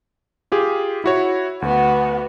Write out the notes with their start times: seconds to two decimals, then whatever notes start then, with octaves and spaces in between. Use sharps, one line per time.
0.52 F4 G4 G#4
1.04 E4 F#4 C#5
1.62 D2 B3 F#4